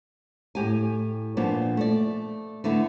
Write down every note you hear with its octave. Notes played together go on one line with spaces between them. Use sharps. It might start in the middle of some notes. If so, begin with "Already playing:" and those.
A2 G4 G#5
A#2 F3 B3 D4
A3 D5
D3 A3 B3 E4